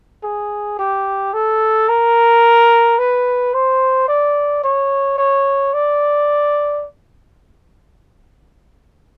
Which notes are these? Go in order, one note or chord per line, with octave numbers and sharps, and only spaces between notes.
G#4
G4
A4
A#4
B4
C5
D5
C#5
C#5
D5